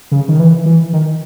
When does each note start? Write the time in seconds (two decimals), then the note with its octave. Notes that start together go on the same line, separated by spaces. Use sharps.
0.11 C#3
0.28 D#3
0.39 E3
0.66 E3
0.93 D#3